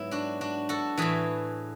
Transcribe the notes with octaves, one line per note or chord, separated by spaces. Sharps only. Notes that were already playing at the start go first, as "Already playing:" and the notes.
Already playing: G#2 F#3 B3 E4
D4 F#4
D4 F#4
F#4 A4
A2 E3 G#4 B4